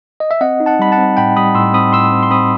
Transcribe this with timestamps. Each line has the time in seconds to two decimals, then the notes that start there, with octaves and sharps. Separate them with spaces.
0.20 D#5
0.31 E5
0.41 C4 D#5 F#5
0.60 D#4
0.66 F#5 A5
0.79 G3 B5
0.92 F#5 A5
0.98 C4
1.17 A2 G5 B5
1.37 G3 B5 D#6
1.55 A2 C6 E6
1.74 C4 B5 D#6
1.93 A2 C6 E6
2.12 C4
2.23 C6
2.31 C4 B5 D#6